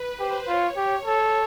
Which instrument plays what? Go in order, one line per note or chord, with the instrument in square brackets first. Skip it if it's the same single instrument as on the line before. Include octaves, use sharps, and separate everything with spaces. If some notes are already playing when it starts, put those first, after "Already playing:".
Already playing: [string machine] B4
[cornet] G4 [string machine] C5
[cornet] F4 [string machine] C#5
[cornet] G4 [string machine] C#5
[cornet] A4